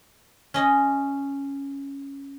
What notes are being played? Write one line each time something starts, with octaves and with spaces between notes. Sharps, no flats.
C#4 D#5